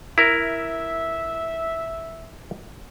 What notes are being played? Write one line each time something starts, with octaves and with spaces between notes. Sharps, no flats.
E4 A#4 E5